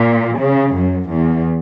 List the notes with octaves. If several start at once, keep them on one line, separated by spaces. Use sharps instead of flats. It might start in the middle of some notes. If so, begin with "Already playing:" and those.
Already playing: A#2
C#3
F#2
E2